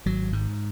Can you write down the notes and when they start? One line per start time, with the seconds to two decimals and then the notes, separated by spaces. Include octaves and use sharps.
0.06 G#1 F#3
0.33 G#2